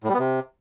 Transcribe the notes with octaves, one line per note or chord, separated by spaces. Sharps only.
A2
G3
B3
C3